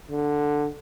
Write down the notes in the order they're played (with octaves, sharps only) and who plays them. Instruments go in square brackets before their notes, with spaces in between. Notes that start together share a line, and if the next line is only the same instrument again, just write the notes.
[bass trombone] D3